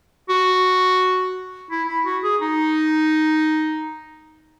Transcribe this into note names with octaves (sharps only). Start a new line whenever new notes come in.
F#4
E4
E4
F#4
G#4
D#4